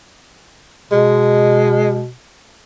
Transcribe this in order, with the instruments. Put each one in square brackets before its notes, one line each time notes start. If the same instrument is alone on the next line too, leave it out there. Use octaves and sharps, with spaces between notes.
[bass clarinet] B2 [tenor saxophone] G#3